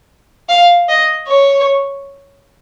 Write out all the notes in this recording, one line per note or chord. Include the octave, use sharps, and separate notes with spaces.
F5
D#5
C#5